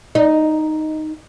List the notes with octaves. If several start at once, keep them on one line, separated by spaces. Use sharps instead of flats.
D#4